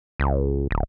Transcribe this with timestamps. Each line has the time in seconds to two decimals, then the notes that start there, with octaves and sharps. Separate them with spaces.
0.20 C#2
0.71 D1